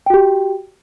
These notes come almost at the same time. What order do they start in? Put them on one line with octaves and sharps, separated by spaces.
G5 F#4 G4